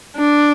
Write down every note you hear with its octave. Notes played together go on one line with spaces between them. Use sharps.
D4